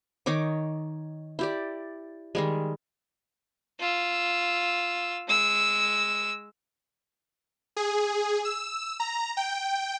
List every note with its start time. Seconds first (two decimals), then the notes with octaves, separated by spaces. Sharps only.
0.26 D#3 D#4 C#5 D6
1.39 E4 G4 D5
2.35 D#3 G3 G#3
3.80 F4 E6
5.28 G#3 E6
7.77 G#4
8.45 E6
9.00 A#5
9.37 G5